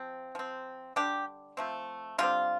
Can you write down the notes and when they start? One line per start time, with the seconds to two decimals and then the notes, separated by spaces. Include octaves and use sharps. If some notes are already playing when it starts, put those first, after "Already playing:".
Already playing: F3 C4
0.35 F3 C4
0.96 D3 G3 C4 D4 G4
1.57 F3 A3 C4
2.18 D3 G3 C4 F4